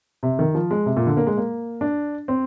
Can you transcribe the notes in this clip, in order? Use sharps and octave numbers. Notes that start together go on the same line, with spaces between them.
C3
D#3
F3
G#3
C3
A#2
D3
A#3
G#3
A#3
D4
C4